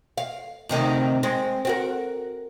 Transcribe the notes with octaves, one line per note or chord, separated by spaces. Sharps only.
F5
D2 C3 D#3
G#3 C4
C4 F#4 A#4